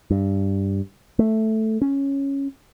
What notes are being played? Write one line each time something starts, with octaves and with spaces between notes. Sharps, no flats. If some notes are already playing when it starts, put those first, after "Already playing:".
G2
A3
C#4